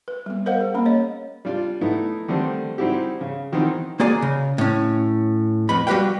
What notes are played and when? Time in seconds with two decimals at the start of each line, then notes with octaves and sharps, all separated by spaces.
0.08 B4
0.26 G3 B3
0.46 A#4 C5 D#5 F5 F#5
0.61 G#4
0.74 A#3 C#4 B5
0.86 C#5 D#5
1.45 G3 D4 F4 D5
1.81 A3 B3 D#4 E4
2.28 D3 D#3 G3 A3 C4
2.78 G3 C4 D#4 E4 F#4 G4
3.21 C#3
3.52 B2 D#3 E3 C4 D#4 F#4
4.00 A#3 F#4 G#4 D5 G#5
4.22 C#3
4.58 A2 C#4
5.69 F2 B3 B5
5.87 G3 F#4 G4 B4 F5 G5